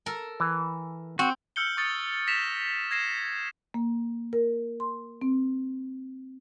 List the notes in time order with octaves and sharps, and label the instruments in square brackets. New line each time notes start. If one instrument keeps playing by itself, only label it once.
[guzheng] A4 A#4
[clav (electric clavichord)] E3
[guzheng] C4 [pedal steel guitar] F#4
[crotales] E6 F6 G6 C#7 G7
C#6 D#6 A6 C#7
A#6 B6 E7 F7
G#6 A#6 C7 E7
[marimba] A#3
A#4
C6
C4